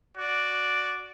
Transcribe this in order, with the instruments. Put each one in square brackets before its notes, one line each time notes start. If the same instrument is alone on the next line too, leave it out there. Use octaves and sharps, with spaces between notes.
[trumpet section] F#4 D5